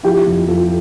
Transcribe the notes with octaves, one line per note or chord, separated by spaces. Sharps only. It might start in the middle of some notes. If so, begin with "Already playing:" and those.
F3 E4 G4
F2
F2 F4 A4